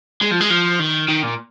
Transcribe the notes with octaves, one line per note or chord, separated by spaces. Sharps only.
G#3
F3
G#3
F3
D#3
D#3
A#2